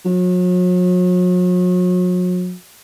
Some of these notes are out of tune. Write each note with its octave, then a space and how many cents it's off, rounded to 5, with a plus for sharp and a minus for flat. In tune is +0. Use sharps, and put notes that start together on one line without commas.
F#3 -40